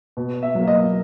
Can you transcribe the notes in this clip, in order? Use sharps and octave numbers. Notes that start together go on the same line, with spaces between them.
B2
E5
F#3 A#3
D#5